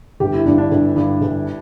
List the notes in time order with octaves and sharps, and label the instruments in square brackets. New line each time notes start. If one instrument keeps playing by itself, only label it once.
[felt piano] G1 [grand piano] G4
[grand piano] E4
[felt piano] G2 D3 [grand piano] D4
[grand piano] D4
[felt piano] G1
G2 D3
G1